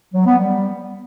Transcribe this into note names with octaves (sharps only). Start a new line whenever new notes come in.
F#3
B3
G3